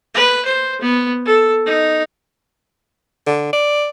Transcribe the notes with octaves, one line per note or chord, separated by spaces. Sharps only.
B4
C5
B3
A4
D#4
D3
D5